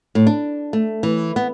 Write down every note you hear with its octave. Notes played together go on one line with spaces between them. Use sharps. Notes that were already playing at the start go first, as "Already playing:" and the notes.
A2
D4
A3
E3
B3